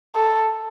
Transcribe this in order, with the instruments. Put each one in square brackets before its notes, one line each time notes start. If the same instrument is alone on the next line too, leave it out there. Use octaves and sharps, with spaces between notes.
[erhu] A4